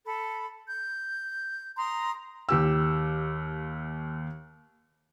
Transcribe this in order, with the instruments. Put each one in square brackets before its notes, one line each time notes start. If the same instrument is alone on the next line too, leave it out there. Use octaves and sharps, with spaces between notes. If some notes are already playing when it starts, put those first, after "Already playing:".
[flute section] A4 B5
G6
A#5 C6 D#6
[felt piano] D#2 G4 E6